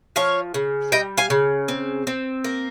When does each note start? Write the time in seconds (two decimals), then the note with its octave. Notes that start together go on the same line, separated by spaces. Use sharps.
0.16 F3 C#5 F5
0.54 C#3
0.92 G3 D#5 G5
1.17 F5 G#5
1.30 C#3
1.68 C4
2.07 C4
2.44 A#3